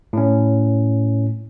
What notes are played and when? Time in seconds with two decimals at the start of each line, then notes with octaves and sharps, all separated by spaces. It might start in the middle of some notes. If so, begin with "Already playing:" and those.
0.13 A2 C#4